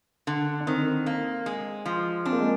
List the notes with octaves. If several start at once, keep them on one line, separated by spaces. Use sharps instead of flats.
D3
D4
D#3 C4
A#3
G#3
F3
C4 D4
A#3
G#3